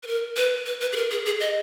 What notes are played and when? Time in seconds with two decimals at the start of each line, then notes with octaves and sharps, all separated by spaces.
0.03 B4
0.07 A#4
0.36 B4
0.66 B4
0.81 B4
0.93 G#4
0.96 A#4
1.11 G#4
1.26 G#4
1.40 D#5